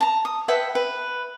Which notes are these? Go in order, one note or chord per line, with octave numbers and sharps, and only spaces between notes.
A5 A#5
D#6
B4 E5 F#5 G5
B4